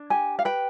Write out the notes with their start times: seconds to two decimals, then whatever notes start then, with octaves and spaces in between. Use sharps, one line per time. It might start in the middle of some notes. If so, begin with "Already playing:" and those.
Already playing: D4
0.10 G4 G#5
0.39 F5
0.45 B4 G5